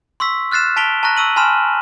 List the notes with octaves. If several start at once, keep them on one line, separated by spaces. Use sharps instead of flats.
C6 C#6 E6 B6
F6 F#6 A6 C7 E7
A5 B6 D7 F7 G7
A5 A#5 C#6 F#6 A#6
C#6 E6 D#7 F#7
G#5 A5 B5 C6 F6 E7